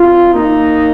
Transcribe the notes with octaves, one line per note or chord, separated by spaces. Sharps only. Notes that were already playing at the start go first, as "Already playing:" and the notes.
Already playing: C4 F4
A#3 D#4